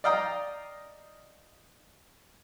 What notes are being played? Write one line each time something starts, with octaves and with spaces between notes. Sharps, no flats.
D5 D#5 F5 G5 A#5 D#6